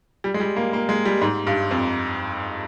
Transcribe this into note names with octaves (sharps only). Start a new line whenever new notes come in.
G3
G#3
G3
A#3
A#3
G#3
G3
G#2
G2
F2